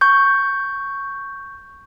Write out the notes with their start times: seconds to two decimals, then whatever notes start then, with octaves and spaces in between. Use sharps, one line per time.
0.01 C#6 G6